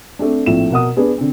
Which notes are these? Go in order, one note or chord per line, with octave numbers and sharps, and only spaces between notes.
A3 C4 D4
A#1 A2 F3 C4 E7
B2 A#4 F#5 D#6
B3 D4 G#4 B4
D3 C4